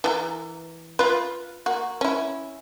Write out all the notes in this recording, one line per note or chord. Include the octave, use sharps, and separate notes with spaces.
E3 A4 A#4
F4 B4
A#3 F#4
C#4 E4